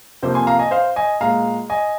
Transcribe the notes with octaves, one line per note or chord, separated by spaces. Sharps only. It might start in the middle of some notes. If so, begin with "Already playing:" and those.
F2 C3 F3 A#3 C5
G#5 C6
F5 A#5
D#5 G#5
C5 F5
D#5 G#5
A#2 G#3 F5 A#5
D#5 G#5